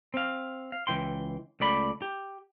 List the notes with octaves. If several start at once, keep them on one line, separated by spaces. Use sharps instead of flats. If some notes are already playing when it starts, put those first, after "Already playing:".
C4 F5
F5
C#2 E3 G5 C6
C#2 A3 D5 B5
G4